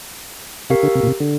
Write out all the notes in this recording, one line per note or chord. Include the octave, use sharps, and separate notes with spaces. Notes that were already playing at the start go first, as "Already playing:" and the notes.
C3 G4 A#4 F5
D3
C3
A#2
C3
D3